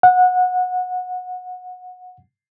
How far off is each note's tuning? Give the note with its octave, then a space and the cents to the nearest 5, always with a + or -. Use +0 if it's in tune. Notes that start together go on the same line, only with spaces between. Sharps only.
F#5 -20